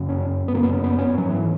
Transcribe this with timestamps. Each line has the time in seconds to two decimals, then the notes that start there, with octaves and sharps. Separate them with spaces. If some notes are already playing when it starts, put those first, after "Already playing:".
Already playing: F#2 C#3
0.09 C#4
0.48 B3
0.54 F#2 C#3 A#3
0.63 B3
0.73 C#4
0.84 B3
0.99 C#4
1.13 G#2 F#3
1.29 E3